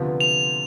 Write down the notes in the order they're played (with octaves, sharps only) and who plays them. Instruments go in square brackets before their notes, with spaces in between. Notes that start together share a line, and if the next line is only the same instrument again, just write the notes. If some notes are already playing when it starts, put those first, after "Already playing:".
Already playing: [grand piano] D2 C3 F3 B3
[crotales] F7